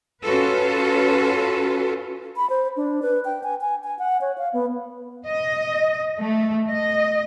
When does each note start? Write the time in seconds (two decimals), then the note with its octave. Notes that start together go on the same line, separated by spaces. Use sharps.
0.23 C#4 F4 F#4 A4 B4
2.37 B5
2.50 C5
2.77 D4
3.02 B4
3.25 G5
3.43 G#5
3.61 G#5
3.84 G#5
3.99 F#5
4.21 C#5
4.38 F5
4.53 B3
5.27 D#5
6.20 A3
6.69 D#5